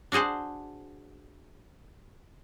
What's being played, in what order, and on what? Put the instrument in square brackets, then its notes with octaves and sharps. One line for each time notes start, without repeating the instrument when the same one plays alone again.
[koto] D4 F#4 G#4 C5 F#5